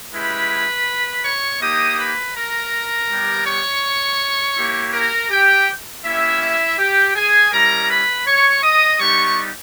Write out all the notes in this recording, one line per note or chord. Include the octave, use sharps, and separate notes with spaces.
G#3 C#4 E4 G4 B4 B5
C#5 C#6
A#3 D#4 G4 D#5 D#6
B4 B5
A#4 A#5
G3 B3 G4
C#5 C#6
A#3 E4 G4
A#4 A#5
G4 G5
A#3 C#4 E4 G4 E5
G4 G5
G#4 G#5
G3 C#4 E4 A#4 A#5
B4 B5
C#5 C#6
D#5 D#6
G3 B3 D#4 G4 C#5 C#6